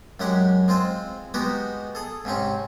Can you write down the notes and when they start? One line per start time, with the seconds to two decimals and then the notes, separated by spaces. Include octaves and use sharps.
0.20 F#2 F#3 G#3 G4 F#5
0.68 G#3 C4 F4 C5
1.34 G#3 B3 D#4 F#4 G4
1.95 G#4 A4
2.25 G#2 C3 C4 C#4